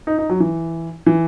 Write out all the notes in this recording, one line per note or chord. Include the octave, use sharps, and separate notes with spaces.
D#4
D#4
F#3
E3
E3